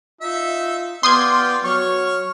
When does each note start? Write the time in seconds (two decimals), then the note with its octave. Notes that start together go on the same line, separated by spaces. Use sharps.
0.21 D#4 F4 E5
1.03 B3 F4 G4 D5 C6 D#6 G#6
1.64 F#3 C#5 C#6 F6